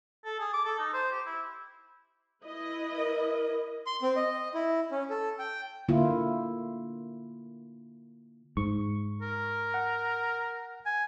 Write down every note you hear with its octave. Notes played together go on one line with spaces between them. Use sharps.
A4
G#4
D6
A4
D#4
C5
G4
E4
E4 B4 D#5
A#4
C6
C4
D#5
E4
C#4
A4
G5
D3 A#3 E4 F4
G#2 C#6
A#4
F#5
G#5